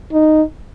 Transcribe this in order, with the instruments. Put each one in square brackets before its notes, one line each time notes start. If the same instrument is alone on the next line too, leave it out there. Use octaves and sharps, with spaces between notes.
[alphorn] D#4